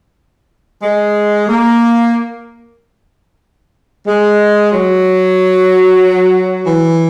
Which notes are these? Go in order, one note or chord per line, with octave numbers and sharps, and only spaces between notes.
G#3
A#3
G#3
F#3
E3